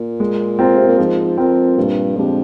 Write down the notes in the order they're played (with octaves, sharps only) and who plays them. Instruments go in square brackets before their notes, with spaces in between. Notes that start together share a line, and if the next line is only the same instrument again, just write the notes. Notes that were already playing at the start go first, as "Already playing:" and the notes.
Already playing: [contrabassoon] A#2
[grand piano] G#3
C4 F4 A#4
[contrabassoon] C3
A#2
[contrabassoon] G#2 [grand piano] F3
[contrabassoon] F2 [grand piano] C4 F4 A#4
[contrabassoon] G2 [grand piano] A#2
[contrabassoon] F2 [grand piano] F3 G#3 D4 G4